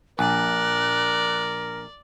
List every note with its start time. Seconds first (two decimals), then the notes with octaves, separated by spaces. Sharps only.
0.19 A#1 A#4 D5 F#6